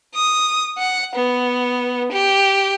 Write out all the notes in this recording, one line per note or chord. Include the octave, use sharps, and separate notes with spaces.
D#6
F#5
B3
G4